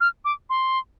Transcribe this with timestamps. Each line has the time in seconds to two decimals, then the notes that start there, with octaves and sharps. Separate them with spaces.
0.01 F6
0.25 D6
0.50 C6